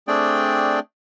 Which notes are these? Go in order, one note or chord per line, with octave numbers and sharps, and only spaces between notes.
A3 C4 D4 G#4 D5 G5